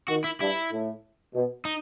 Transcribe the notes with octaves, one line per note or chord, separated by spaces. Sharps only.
D#3 F#4
E4
G2 E4
A2
B2
D#4